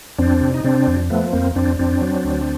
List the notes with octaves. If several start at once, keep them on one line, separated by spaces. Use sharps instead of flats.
F2 C4 D4
C3
D#4
C3 C4 D4
F2
F3 A3 B3
F2 A#3 C4
F2 C4 D4
F2 C4 D4
F#3
D2